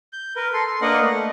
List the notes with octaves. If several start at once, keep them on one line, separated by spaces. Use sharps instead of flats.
G6
A#4 B4
A4 C6
C6
A#3 D4 A#4 B4 D#5 F#5
A3